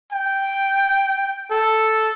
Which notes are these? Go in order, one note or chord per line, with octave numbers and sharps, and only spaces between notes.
G5
A4